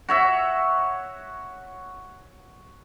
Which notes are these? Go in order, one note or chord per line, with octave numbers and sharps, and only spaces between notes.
F#4 C#5 E5